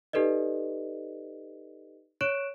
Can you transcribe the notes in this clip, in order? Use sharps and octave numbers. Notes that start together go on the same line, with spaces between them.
D#4 G4 A4 B4 D5 D#5
C#5 C#6 F#6 D7 E7